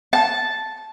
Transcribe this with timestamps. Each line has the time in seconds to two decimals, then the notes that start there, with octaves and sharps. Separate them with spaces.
0.13 A5